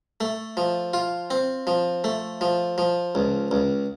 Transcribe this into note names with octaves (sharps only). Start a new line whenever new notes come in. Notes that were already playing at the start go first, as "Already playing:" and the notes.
A3
F3
F4
C4
F3
A3
F3
F3
C#2
C#2